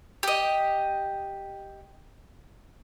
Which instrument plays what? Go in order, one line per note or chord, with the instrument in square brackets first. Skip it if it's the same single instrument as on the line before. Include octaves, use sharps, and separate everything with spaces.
[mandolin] G4 D#5